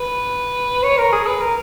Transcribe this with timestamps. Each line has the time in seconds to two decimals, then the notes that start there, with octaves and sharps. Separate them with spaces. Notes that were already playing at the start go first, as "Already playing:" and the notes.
Already playing: B4
0.83 C#5
0.98 A#4
1.12 G#4
1.27 B4
1.41 A#4